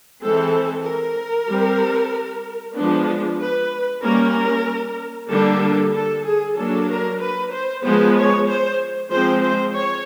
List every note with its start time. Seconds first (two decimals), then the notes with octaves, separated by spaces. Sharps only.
0.22 E3 G#3 C4 A4
0.85 A#4
1.49 G3 C4
2.76 F3 G#3 B3 D4
3.39 B4
4.03 G3 A#3 C#4 A#4
5.29 D3 G3 A#3 D4 A4
5.93 A4
6.24 G#4
6.56 F#3 A#3 D4 A4
6.89 A#4
7.20 B4
7.52 C5
7.84 F3 G#3 B3 C5
8.16 C#5
8.47 C5
9.10 F3 G#3 C4 C5
9.42 C5
9.75 C#5